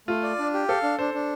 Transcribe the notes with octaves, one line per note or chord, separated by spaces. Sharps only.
A3 F4
D5
D4
G4
A4 F5
D4
D4 C5
D4